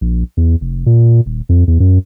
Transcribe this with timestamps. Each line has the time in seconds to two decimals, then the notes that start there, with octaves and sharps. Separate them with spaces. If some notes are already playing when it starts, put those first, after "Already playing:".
0.01 A#1
0.37 E2
0.61 F1
0.86 A#2
1.26 D#1
1.49 F2
1.68 E2
1.80 F#2